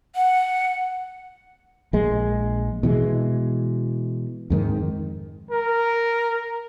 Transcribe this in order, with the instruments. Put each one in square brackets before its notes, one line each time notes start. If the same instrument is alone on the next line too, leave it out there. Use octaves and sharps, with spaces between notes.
[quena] F#5
[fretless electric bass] A#1 G#3
B2 E3 G#3
F2 G#2 D#3
[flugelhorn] A#4